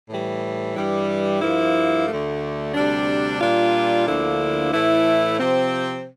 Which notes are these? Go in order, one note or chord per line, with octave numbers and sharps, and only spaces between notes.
A2 E3 G3
G2 E3 G3
G2 F3 A#3 E4
D2 D3 A3
D2 C3 G3 D4
A#2 G3 D4 F4
D2 D3 F3 A#3 E4
A2 E3 A3 E4
C3 F3 C4